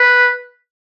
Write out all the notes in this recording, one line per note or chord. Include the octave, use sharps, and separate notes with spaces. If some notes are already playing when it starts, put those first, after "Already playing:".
Already playing: B4